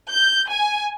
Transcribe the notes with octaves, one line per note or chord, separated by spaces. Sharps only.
G6
G#5